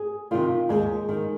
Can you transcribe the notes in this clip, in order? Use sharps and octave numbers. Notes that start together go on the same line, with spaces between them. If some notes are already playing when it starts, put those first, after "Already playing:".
Already playing: G#4
C3 D#3 F4
D#2 G#3
D#3